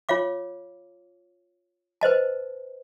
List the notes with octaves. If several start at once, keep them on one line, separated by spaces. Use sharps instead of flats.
F4 C#5 F5 D6
B4 C5 D#5 A5